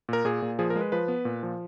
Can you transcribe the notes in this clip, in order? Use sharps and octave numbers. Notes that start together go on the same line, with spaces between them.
A#2 A#4
A#2 G#4
A#2
F3 G#4
A#4
G#3
B4
F3 B4
B3
A#2
F3